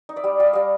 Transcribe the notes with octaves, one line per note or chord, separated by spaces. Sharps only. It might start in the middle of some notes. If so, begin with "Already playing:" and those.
D#4
D5 E5
G3
G3 F5
E5
G3 D#5 F5